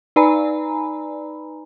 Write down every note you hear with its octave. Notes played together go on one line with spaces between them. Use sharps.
D#4 B4 D5 G#5 A#5 B5